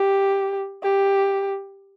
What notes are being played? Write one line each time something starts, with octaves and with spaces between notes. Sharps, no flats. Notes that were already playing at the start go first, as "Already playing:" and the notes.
Already playing: G4
G4